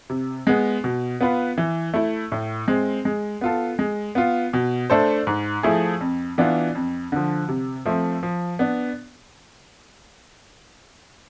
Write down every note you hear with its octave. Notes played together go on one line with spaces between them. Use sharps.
C3
G#3 B3
B2
B3 F4 B4
E3
A3 E4
A2
G#3 C4
G#3
B3 F4 A4
G#3
B3 F4
B2
A3 D4 A4 C5
G#2
F3 A3 E4 G#4
F2
E3 B3 D4 F4
F2
D3 F3
C3
F3 A3 C4
F3
B3 D4